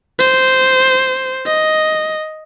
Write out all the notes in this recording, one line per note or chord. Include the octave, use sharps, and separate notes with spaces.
C5
D#5